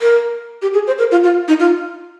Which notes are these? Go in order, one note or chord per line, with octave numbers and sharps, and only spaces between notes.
A#4
G4
G#4
C5
A#4
F4
F4
D#4
F4